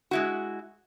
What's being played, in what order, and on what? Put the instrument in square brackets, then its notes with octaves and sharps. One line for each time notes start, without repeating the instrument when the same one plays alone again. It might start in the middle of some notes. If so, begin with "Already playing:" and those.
[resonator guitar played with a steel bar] G#3 E4 F#4